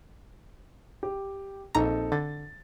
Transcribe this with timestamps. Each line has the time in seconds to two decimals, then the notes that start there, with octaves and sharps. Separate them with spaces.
1.03 G4
1.75 A#1 C4 D#4 A4 A#5
2.12 D3 A6